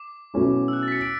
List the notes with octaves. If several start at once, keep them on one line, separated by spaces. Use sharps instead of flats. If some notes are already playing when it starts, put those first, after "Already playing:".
Already playing: D6
B2 F#3 A3 C#4 E4
E6
F#6
A6
B6
C#7
D7